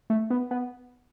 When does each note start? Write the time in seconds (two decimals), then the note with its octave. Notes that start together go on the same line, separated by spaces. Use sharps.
0.10 A3
0.30 B3
0.51 B3